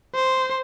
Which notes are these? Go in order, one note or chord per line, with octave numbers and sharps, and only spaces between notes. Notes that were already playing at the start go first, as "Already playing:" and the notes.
C5